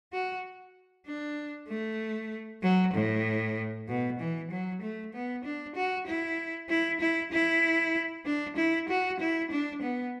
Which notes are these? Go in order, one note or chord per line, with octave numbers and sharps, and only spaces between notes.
F#4
D4
A3
F#3
A2
B2
E3
F#3
A3
B3
D4
F#4
E4
E4
E4
E4
D4
E4
F#4
E4
D4
B3